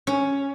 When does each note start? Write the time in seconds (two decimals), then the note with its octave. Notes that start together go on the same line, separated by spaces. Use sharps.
0.07 C#4